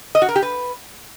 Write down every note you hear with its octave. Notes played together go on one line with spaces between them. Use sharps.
D#5
F#4
A#4
G4
B4